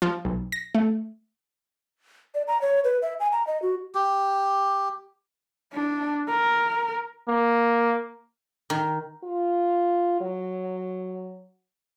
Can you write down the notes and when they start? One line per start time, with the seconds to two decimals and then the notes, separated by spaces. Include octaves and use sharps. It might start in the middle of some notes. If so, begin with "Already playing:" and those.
0.02 F3
0.25 B1
0.52 A#6
0.75 A3
2.35 D5
2.48 A#5
2.62 C#5
2.84 B4
3.02 E5
3.20 G#5
3.32 A#5
3.47 D#5
3.62 F#4
3.95 G4
5.73 D4
6.29 A#4
7.28 A#3
8.70 D#3
9.24 F4
10.21 F#3